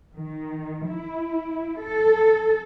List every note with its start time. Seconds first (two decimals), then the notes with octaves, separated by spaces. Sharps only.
0.15 D#3
0.88 E4
1.82 A4